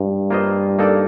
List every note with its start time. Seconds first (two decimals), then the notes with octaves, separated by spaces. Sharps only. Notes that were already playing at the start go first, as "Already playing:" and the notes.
Already playing: G2
0.31 A#3 F4 C5 D#5
0.79 A#3 D#4 A4 D5